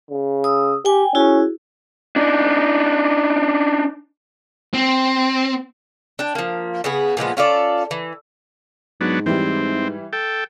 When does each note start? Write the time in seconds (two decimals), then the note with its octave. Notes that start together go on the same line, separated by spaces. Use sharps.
0.10 C#3
0.44 D#6 E6
0.85 G4 G5 G#5
1.15 C#4 E4 F#4 G#4
2.16 D4 D#4
4.74 C4
6.19 D4 G5
6.35 F3 A#3
6.84 C#3 B3 G#4
7.17 A#2 F3 G#3 B3
7.37 C#4 F4 A4 D5
7.91 E3
9.01 G#2 F#3 B3 D4
9.26 E3 G3 C4
10.13 A4 G5